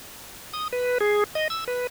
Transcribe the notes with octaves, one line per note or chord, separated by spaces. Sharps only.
D#6
B4
G#4
D#5
E6
B4